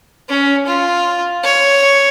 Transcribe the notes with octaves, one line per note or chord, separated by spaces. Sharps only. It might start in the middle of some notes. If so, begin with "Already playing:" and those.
C#4
F4
C#5